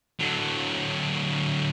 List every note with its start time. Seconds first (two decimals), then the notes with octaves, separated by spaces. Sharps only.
0.19 D3 F#3